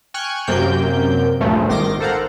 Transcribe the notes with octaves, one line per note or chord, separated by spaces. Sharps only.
G5 G#5 C#6 F6 F#6 G#6
F#2 C3 A#3 G5 G6
D2 G2 A#2 C#3 F3 A3
G#1 D#3 C6 D6 A#6
A4 A#4 C5 F5 F#5 A#5